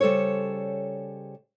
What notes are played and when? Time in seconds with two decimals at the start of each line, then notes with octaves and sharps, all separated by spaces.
0.01 C#3 G3 A4 C5 C#5